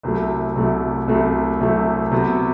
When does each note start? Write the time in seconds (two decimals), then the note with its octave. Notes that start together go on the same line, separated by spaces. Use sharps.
0.03 C2 C3 F#3 A3
0.56 C2 C3 F#3 A3
1.08 C2 C3 F#3 A3
1.60 C2 C3 F#3 A3
2.12 C3 F#3 B3 F#4 A4